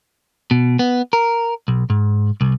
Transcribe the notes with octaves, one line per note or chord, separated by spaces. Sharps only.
B2
B3
A#4
B1
G#2
C2